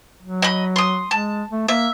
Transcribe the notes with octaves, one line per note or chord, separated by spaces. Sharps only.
F#3
D#5 B5
C6 D#6
G#3 A5
A3
A#3 E5